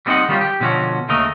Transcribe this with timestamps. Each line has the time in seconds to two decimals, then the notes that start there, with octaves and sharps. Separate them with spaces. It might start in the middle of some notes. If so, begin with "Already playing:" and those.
0.06 G3 B3 C4 D#4 D#5 F#5
0.29 D#3 G3 C#4 F4 G4
0.41 G4
0.61 B2 D3 F3 C#4 F#4
1.09 D#2 C#3 A3 A#4 D#5